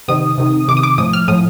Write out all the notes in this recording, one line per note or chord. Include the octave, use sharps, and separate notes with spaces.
C3 D#3 D#6
C3 D#3
C3 D#3 D6
D#6
D6
A2 F3 D#6
F6
A2 F3 D#6